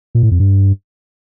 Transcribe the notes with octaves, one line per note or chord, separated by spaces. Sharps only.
A#2
A2
F2
G2